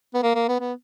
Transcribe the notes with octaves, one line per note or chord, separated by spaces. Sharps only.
B3
A#3
A#3
B3
B3